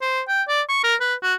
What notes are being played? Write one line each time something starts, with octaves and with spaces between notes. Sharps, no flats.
C5
G5
D5
C#6
A#4
B4
F#4